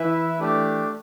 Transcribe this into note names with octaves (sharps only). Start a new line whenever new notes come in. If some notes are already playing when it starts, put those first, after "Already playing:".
Already playing: E3 E4 B4 E5
A3 D4 G4